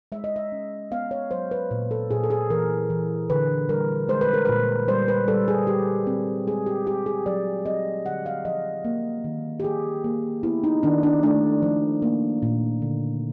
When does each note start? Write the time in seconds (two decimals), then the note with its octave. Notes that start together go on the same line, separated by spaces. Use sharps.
0.12 G#3 E5
0.24 D#5
0.36 E5
0.52 C#4
0.91 B3 F5
1.11 C#5
1.31 F#3 C5
1.51 B4
1.71 A#2
1.91 A4
2.11 A#2 G#4
2.24 A4
2.30 G#4
2.50 E3 A#4
2.90 E3
3.30 D3 B4
3.69 G3 A#4
4.09 G#3 C5
4.21 B4
4.34 A#4
4.45 A#2 B4
4.88 G3 C5
5.08 B4
5.28 G3 A4
5.48 G#4
5.67 G3 G4
6.07 C4
6.47 G#3 G#4
6.66 G4
6.87 G#3 G4
7.06 G#4
7.26 F#3 D5
7.65 C4 D#5
8.05 D3 F#5
8.26 F5
8.45 F3 D#5
8.85 A#3
9.24 D#3
9.60 G4
9.64 F3 G#4
10.04 A#3
10.43 B3 E4
10.64 D#4
10.83 D#3 D4
11.03 D4
11.23 A3 D4
11.62 F3
12.02 A#3
12.42 A#2
12.82 D3